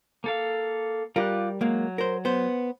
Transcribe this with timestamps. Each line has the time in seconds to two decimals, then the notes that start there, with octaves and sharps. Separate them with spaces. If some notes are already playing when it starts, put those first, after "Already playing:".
0.24 A#3 A4 F5
1.16 G3 F4 G4 A#4 F#6
1.61 F#3 G#3 A#3
1.98 A#4 C5
2.25 B3 C5